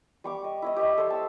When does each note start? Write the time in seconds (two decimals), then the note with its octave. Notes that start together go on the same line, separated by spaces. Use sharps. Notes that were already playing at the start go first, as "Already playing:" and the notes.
0.24 G3 C#6 D6
0.44 D#5
0.62 E4 C#5 D#5
0.76 G4 C#5 D#5 E5
0.98 A4 C5
1.10 A5 E6